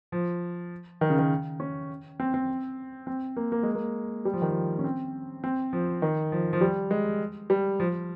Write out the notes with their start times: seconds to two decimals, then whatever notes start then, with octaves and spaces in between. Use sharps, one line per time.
0.12 F3
1.01 D#3
1.10 C#3
1.19 D#3
1.60 C#4
2.20 C4
2.34 C4
3.07 C4
3.36 A#3
3.52 A#3
3.63 G#3
3.75 A#3
4.25 G3
4.33 F3
4.42 D#3
4.50 F3
4.79 C#4
4.84 C4
5.44 C4
5.73 F3
6.02 D#3
6.32 F3
6.53 F3
6.61 G3
6.91 G#3
7.50 G3
7.80 F3